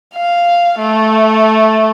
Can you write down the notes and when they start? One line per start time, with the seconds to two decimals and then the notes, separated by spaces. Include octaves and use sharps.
0.14 F5
0.78 A3